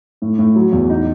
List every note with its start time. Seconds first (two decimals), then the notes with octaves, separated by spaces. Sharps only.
0.22 A2
0.39 A2
0.56 F#3
0.72 E2
0.90 D#4